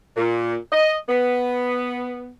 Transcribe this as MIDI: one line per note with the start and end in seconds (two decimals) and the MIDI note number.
0.16 0.55 46
0.72 0.94 75
1.09 2.30 59